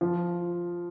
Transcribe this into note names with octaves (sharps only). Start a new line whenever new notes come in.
F3